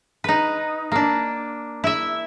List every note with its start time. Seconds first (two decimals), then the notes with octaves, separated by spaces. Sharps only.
0.24 D#4 B4
0.92 A#3 D4
1.84 E4 E5